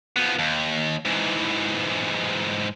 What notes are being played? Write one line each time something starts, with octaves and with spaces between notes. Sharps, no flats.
F3 B3
D#2
G#2 E3